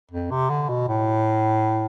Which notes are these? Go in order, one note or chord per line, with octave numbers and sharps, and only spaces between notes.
F2
C3
D3
B2
A2